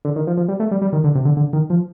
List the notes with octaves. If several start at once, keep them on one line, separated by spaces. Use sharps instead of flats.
D3
D#3
F3
F3
G3
A3
G3
G3
D#3
D3
C3
D3
D3
D#3
F3